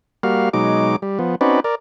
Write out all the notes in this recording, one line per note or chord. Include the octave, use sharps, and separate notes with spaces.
G3 A#3 F#4 F5
B2 F#3 G#3 D#4 D6
G3
F3 B3
C4 C#4 D#4 F#4 B4 D5
A#4 D5